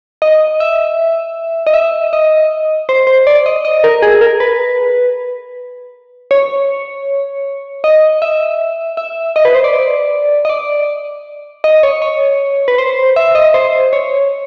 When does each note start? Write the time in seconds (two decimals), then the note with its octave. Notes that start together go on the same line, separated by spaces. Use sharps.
0.22 D#5
0.60 E5
1.67 D#5
1.74 E5
2.13 D#5
2.89 C5
3.07 C5
3.27 D5
3.46 D#5
3.65 D#5
3.84 A#4
4.02 G#4
4.21 A#4
4.40 B4
6.31 C#5
7.84 D#5
8.22 E5
8.97 E5
9.36 D#5
9.45 B4
9.55 C5
9.64 D5
10.45 D#5
10.50 D5
11.64 D#5
11.83 C#5
12.02 C#5
12.68 B4
12.78 C5
13.16 E5
13.35 D#5
13.54 C5
13.93 C#5